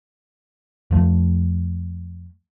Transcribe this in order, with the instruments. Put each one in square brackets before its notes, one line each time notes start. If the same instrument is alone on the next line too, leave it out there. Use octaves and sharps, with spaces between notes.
[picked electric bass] F2 F3 A3